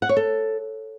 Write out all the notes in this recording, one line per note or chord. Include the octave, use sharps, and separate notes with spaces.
F#5
C#5
A4